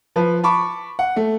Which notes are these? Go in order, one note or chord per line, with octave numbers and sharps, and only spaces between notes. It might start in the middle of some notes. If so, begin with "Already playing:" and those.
F3 B4
A5 B5 C#6 D6
F#5
A3